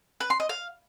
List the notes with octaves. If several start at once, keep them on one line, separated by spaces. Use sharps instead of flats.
B4
C6
D#5
F5